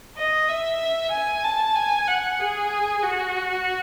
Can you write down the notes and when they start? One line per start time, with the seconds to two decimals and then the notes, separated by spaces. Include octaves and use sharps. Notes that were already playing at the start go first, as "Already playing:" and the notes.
0.17 D#5
0.48 E5
1.11 G#5
1.44 A5
1.75 G#5
2.07 F#5
2.39 G#4
3.03 F#4